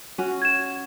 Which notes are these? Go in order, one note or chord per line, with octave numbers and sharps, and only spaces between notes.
C#4 F#4
G#6 E7